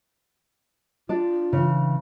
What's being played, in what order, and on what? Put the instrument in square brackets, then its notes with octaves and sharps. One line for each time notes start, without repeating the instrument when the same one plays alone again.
[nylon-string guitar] D4 D5 [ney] F4
[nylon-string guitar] C#3 E3